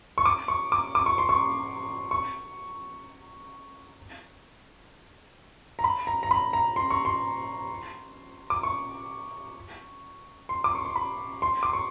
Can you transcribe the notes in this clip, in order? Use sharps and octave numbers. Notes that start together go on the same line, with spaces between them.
C#6
D6
C#6
D6
D6
C#6
C6
C#6
C#6
A#5
B5
A#5
A#5
B5
A#5
C6
C#6
C6
D6
C#6
C6
D6
C#6
C6
B5
C6
D6
C#6